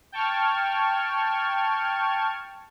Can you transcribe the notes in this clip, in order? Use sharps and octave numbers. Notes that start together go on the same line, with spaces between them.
G5 A5 C#6 F6 G#6